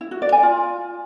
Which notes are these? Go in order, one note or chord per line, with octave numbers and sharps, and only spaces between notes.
E4
F#4
D5
G#5
F4